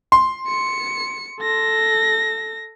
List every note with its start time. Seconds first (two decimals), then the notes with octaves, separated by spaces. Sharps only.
0.12 C6
0.47 C#7
1.41 A4 A#6